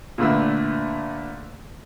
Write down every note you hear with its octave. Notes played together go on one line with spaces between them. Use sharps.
A#2 D3 A3 B4 E6